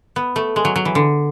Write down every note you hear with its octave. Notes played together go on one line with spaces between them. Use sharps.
B3
A3
G#3
F#3
F#3
E3
D3